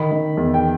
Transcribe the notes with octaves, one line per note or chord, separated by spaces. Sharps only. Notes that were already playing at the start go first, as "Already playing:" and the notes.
Already playing: D#3 B5
D#3
E2
G5